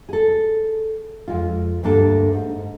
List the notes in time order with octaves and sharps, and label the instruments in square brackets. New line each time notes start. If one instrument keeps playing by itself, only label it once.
[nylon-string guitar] G#4 A4
F2 G#3 F4
D2 G2 A#3 D4 A4
G#2